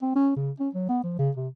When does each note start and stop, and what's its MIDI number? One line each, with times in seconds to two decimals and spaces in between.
0.02 0.12 60
0.16 0.35 61
0.36 0.51 49
0.60 0.69 61
0.74 0.89 54
0.89 0.99 59
1.04 1.14 53
1.19 1.31 49
1.36 1.48 48